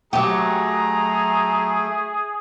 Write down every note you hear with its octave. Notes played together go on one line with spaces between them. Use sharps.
F#3 A3 G4 G#4 A#5